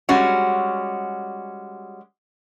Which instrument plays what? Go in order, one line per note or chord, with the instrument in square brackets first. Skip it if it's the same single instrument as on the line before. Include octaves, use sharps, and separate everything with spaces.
[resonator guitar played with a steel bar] G3 G#3 C#4 F#4